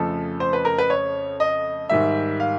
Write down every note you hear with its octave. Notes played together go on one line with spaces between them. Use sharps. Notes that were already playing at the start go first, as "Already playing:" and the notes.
Already playing: F2 C#3 F3 A3 A4
C5
B4
A#4
B4
C#5
D#5
G#2 D#3 G3 E5
F5